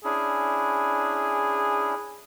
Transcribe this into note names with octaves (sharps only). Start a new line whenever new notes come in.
C#4 D4 E4 G#4